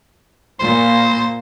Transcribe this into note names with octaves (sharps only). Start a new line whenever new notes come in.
A#2 C5